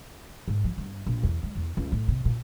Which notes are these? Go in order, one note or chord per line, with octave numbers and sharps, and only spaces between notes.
G#2
F3
G2
A#1
E2
G#3
E2
C#2
A2
C3
A#2